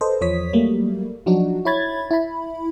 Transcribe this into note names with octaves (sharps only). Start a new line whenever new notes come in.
A4 B4 C5 D#5
E2 F3 C#5 D#6 B6
F#3 G3 A3 A#3
F3 F#3 D4 D#4 F#4
E4 C#5 B5 G#6 A6
E4 B5